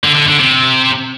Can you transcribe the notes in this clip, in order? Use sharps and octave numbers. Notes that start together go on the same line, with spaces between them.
D3
D3
D3
C3